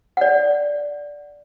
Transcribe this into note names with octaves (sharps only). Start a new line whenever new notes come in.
D5 F#5